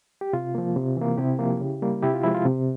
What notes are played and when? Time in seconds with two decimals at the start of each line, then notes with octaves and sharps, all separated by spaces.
0.21 G4
0.33 C3 F4
0.55 F3 A#3
0.76 C3
0.97 E3
1.02 A#3
1.18 C3 E4 G4
1.39 F3 A#3
1.60 C#3
1.82 G3 A#3
2.03 C3 E4 G4
2.14 F4
2.23 F3 G#3 E4
2.35 F4
2.45 C3